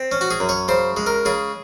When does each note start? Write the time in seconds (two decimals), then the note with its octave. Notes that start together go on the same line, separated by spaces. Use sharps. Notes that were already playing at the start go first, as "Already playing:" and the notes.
Already playing: C4
0.12 C#4
0.21 F#4
0.31 G#4
0.40 F#2
0.49 C#5
0.68 C#3 C5
0.97 G#3
1.06 A#4
1.25 C#3 G#4